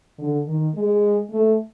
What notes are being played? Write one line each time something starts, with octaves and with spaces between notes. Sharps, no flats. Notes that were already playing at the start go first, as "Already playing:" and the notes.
D3
D#3
G#3
A3